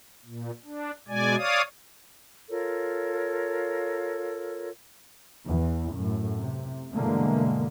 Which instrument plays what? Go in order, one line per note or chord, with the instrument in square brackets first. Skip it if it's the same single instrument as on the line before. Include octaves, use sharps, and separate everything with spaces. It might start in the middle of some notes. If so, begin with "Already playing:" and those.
[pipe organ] A#2
D4
B2 G#3 D5 G#5
C#5 D5 F5 D#6
[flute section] F4 A4 A#4 C#5
[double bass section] E2 E3
F#2 A2
C3
G2 B2 D3 E3 G#3 A#3